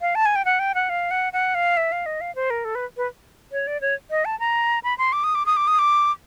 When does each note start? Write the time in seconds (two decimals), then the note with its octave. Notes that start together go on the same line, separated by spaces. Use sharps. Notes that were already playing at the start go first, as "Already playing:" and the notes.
0.01 F5
0.15 A5
0.26 G#5
0.36 G5
0.45 F#5
0.59 G5
0.75 F#5
0.89 F5
1.11 F#5
1.33 F#5
1.55 F5
1.77 E5
1.92 F5
2.06 D#5
2.21 F5
2.35 C5
2.50 A#4
2.65 A4
2.75 B4
2.97 B4
3.52 C#5
3.67 D5
3.81 C#5
4.11 D#5
4.25 A5
4.40 A#5
4.84 B5
4.98 C6
5.13 D6
5.24 D#6
5.35 D6
5.46 D#6
5.57 D6
5.68 D#6
5.79 D6